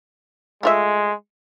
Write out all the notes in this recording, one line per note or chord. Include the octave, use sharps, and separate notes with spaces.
G#3 A3 F4 E5